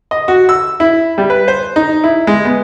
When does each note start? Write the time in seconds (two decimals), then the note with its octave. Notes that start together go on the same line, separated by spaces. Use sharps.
0.11 D#5
0.28 F#4
0.49 E6
0.80 E4
1.18 G3
1.30 B4
1.48 C5
1.76 D#4
2.04 E4
2.27 G#3
2.45 B3